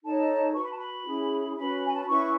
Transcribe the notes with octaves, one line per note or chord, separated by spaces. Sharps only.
D#4 A4 C#5 A5
F#4 B4 C#6
B5
A5
B5
C#4 E4 G#4
C#4 F#4 B4 B5
G#5
A5
B5
C#4 E4 B4 C#6